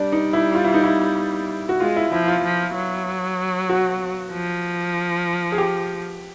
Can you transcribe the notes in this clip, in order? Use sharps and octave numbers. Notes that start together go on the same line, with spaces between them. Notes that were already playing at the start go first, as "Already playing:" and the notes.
Already playing: G3 D4
D#4
E4
F4
E4
D#4
E4
F#4
G#3 F4
E4
F3 E4
F4
F3
F#3
F#4
F3
G#4
G4